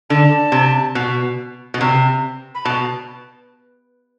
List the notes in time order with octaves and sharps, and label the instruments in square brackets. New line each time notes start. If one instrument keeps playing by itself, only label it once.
[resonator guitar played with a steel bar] D3 [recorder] A5
[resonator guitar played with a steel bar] C3
B2
B2
C3
[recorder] B5
[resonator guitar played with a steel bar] B2 [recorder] A5